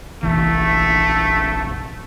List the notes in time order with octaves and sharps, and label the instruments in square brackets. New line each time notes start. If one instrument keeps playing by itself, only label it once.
[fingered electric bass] F1 A#1 E3 [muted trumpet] A3